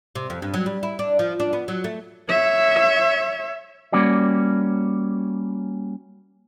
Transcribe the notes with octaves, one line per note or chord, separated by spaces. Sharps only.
C3
F2
G2
F#3
G3
E4
D4
F3
D4
B3
F#3
A3
C#5 E5
G3 A#3 C#4 F#4 D5